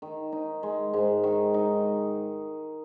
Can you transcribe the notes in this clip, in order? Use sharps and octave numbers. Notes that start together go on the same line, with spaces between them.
D#3
D#4
G#3
G#2
D#3
D#4